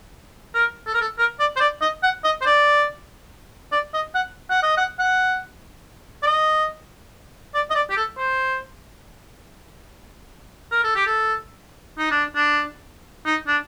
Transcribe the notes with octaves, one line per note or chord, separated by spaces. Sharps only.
A#4
A4
A#4
A4
A#4
D5
C5
D5
D#5
F#5
D#5
C5
D5
D5
D#5
F#5
F#5
D#5
F#5
F#5
D5
D#5
D5
D#5
D5
G4
A4
C5
A#4
A4
G4
A4
D#4
D4
D4
D#4
D4